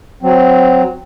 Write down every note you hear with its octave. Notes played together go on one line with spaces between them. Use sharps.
F#3 C4